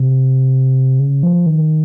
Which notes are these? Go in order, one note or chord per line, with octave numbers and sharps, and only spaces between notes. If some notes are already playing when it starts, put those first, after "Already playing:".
Already playing: C3
C#3
F3
D#3